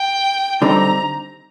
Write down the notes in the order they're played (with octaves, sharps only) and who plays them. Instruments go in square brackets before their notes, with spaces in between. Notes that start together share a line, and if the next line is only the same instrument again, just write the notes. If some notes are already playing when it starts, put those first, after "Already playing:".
Already playing: [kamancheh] G5
[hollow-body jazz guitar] D3 G3 C4 D#4 [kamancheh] A#5